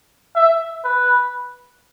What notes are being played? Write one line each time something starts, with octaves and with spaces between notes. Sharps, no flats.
E5
B4